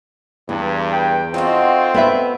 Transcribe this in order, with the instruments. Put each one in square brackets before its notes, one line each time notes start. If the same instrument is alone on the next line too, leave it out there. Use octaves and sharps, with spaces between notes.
[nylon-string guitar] E2 [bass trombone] G2
[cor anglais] G5
[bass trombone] C4 [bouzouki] D#4 F#4 A4 [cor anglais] F4
[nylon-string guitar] B3 B4 E5